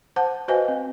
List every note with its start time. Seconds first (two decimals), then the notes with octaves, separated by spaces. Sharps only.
0.16 C5 F#5 A5
0.48 F#4 B4 C5 D#5 F5 G#5
0.68 C4